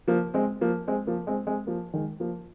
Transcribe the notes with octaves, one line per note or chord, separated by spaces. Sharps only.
F3 A#3
G#3 C4
F3 A#3
G#3 C4
F3 A#3
G#3 C4
G#3 C4
F3 A#3
D#3 G#3
F3 A#3